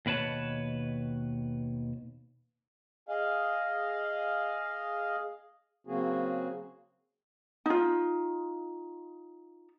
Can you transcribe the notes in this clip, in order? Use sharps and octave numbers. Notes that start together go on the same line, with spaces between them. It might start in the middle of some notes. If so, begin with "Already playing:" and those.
D#2 B2 B4 C#5 A5
G#4 D#5 F5
C#3 F#3 A#3 C4 F#4 G#4
D#4 F4